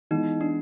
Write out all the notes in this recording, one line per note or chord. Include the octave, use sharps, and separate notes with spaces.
E3 G#3 B3 D#4
D4